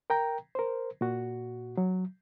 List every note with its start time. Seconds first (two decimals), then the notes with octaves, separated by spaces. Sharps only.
0.10 A#4 G5 A#5
0.55 A#4 C5
1.01 A#2 F#4
1.77 F#3